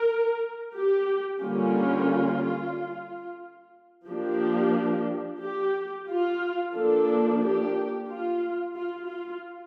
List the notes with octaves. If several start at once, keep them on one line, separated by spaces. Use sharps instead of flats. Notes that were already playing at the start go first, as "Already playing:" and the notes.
Already playing: A#4
G4
D3 G3 A#3 C#4 F4
F3 A#3 D4 G4
G4
F4
F3 A#3 D4 A4
G4
F4
F4
F4